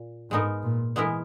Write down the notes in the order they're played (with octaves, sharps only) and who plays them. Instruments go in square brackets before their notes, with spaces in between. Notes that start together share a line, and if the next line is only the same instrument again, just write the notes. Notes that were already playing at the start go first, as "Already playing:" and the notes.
Already playing: [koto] A#2
[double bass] G#2 [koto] G#3 B3 D#4 A#4
[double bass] A#2
[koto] E3 G#3 B3 E4 A#4